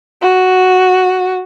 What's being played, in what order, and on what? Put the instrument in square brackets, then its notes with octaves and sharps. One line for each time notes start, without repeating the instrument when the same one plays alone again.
[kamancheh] F#4